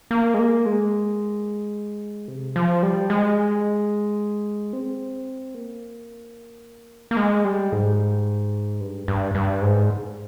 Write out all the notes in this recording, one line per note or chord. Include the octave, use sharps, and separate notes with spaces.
A#3
G#3
A#3
G#3
C3
F3
G3
G#3
C4
A#3
A#3
G#3
G3
G#2
G2
G2
G2
G#2